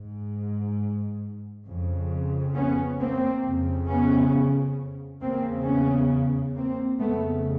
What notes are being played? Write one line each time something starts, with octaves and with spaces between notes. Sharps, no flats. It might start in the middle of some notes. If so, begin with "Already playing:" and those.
Already playing: G#2
F2 C#3
B3 C#4
A#3 C4
F2 C#3
B3 C#4
E2 C#3 A#3 C4
B3 C#4
A#3 C4
F2 C#3 A3 B3